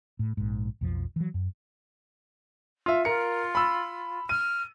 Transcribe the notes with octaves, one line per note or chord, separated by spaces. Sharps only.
A2
A#1 G#2
B1 F2 F3
E3 F#3
F#2
F4 E5
F4 A#4 C#7
B5 E6
F6 D#7